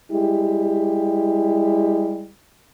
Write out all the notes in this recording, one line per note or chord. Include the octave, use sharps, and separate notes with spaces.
G3 G#3 E4 G4